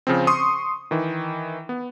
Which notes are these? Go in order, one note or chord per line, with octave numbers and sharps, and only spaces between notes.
C#3 F3 C4
C6 C#6 D#6
D#3 E3
B3